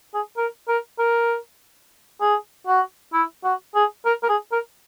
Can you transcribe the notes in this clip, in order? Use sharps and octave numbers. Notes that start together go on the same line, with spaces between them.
G#4
A#4
A#4
A#4
G#4
F#4
E4
F#4
G#4
A#4
A#4
G#4
A#4